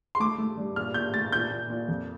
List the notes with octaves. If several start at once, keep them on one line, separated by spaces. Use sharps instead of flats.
C6
A3 D6
A3
G2
A#2 F6
A#2 G6
A3 A6
A#2 G6
A#2
A#2
F2